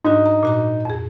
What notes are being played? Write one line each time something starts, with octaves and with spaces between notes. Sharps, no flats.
G#2 D4 D#4 F#4
A#5
A#2 F#4 A#5
F2 G#4